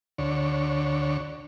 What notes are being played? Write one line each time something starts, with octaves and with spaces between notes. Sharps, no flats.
D2 D3 C#5